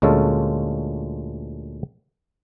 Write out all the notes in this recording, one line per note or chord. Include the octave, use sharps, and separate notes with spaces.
D2 A#2 G#3 C#4 F4 A4